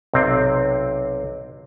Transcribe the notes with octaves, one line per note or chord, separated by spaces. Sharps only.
B1 C3 C4